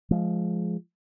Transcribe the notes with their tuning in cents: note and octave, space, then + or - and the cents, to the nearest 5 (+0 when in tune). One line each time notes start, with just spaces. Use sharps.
F3 +0 G#3 +15